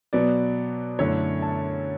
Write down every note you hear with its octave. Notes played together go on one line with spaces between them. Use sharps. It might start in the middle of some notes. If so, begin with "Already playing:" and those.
B2 F#3 B3 D5
F#2 D3 A3 E4 C#5
A5